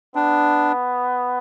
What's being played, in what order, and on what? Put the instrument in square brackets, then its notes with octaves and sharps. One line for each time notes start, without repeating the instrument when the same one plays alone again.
[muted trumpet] B3 [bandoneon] D4